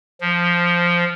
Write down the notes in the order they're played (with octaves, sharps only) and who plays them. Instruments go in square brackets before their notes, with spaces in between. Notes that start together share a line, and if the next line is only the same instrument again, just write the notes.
[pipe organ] F3